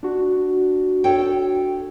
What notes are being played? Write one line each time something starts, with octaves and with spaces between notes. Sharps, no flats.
D4 F#4
A4 C#5 G5